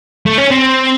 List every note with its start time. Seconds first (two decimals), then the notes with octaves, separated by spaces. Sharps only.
0.26 A3
0.38 C#4
0.51 C4